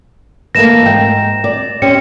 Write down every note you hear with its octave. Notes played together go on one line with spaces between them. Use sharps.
E3 A3 A#3 A#6 E7
G#2 G5
D5
C#4 G4 C5 C#7